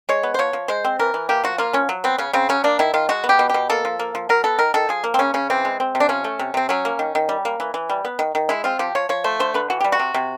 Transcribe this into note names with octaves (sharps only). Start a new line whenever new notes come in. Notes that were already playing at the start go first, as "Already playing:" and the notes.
G#3 C#5
B3
C5
F3 C#5
F3
G#3 C5
C4
E3 A#4
E3
A#3 G4
F3 F#4
A#3 F4
F3 C#4
F#3
B3 C4
C#3 C#4
C#3 C4
F#3 C#4
A#3 D4
D#3 E4
D#3 F4
G#3 F#4
B3
G4
B2
B2 G4
A#3 A4
F3
A#3
F3
F#3 A#4
B3 A4
D#3 A#4
D#3 A4
F3 G#4
A#3
C4
C#3 C#4
C#3 C#4
E3 C4
G#3
C4
C3
D4
F3 C#4
A3
C3
C3 C4
F#3 C#4
A#3
D#3
D#3
G3
A#3
E3
E3
G3
B3
D#3
D#3
G#3 E4
C4 F4
F3 G4
F3 C#5
F3 C#5
A3 C5
D3 C5
D3 B4
E3 F#4
G3 G4
F#4
C3
C3